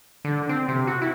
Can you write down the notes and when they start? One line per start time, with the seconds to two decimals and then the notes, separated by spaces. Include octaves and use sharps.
0.25 D3
0.49 C4
0.68 C3
0.87 F#4
1.02 E4